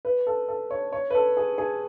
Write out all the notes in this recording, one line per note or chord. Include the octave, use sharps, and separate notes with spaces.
B4
A4
A4
C#5
C#5
B4
A4
G#4
G#4